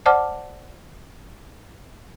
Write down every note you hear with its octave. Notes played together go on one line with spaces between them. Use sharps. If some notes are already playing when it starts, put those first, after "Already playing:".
C5 D5 F#5 A5 D6 F6